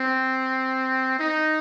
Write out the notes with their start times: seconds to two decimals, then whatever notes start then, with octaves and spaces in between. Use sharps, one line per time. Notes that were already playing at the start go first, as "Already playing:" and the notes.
Already playing: C4
1.19 D#4